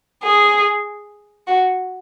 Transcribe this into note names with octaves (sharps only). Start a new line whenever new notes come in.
G#4
F#4